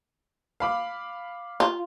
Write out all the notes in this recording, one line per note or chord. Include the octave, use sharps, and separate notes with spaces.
F5 B5 D6
F4